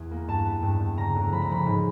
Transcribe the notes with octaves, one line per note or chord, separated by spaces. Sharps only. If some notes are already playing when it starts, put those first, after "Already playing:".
Already playing: E2 G#5
A#3
G2 A5
B3
G2
G2
C#3 A#5
D2
F3 B5
A#5
C#3 B5
G#2